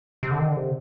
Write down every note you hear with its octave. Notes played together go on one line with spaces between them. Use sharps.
C3
D3
D#3
D3
C3